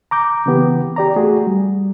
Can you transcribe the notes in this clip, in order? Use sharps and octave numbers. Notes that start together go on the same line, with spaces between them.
A#5 D6 G6
C#3 E3 B3 G4
G4 D5 A#5
A3 F#4 G#4
G3